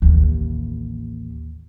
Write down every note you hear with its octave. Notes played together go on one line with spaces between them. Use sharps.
A1 D#2